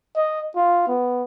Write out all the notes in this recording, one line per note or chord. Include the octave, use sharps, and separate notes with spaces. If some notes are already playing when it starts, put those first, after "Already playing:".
D#5
F4
B3